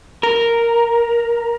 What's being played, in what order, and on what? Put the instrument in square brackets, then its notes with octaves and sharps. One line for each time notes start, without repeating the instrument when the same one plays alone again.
[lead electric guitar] A#4